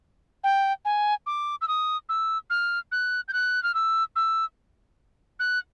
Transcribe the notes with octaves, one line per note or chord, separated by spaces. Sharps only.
G5
G#5
D6
E6
D#6
E6
F6
F#6
G6
F#6
F6
E6
E6
F#6